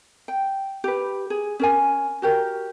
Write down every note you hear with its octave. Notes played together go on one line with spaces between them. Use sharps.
G5
G4 B4
G#4
C#4 A#4 G#5
F#4 G4 A#4